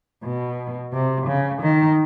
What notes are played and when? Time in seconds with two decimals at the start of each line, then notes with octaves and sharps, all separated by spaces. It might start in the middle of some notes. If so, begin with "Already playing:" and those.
0.24 B2
0.93 C3
1.27 C#3
1.62 D#3